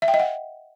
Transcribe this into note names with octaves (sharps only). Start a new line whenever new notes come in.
E5
G5
D#5
F#5